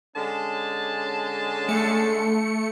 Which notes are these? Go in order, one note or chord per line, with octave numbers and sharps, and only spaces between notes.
D3 G#3 C#4 A5
A3 A4 C#7